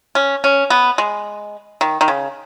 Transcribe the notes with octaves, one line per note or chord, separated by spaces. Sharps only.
C#4
C#4
B3
G#3
D#3
D#3
C#3